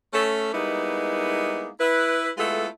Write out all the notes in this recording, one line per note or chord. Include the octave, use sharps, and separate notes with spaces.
A3 C#4 A4
G3 G#3 A#3 B3 D#4 E4
E4 B4
G#3 A3 B3 E4 F4 A4